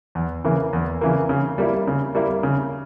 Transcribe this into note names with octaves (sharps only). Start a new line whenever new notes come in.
E2
C#3 E3 A#3
E2
C#3 E3 A#3
C#3
G3 A#3 E4
C#3
G3 A#3 E4
C#3